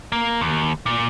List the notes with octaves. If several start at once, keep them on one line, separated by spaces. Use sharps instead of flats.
A#3
D#2
A#2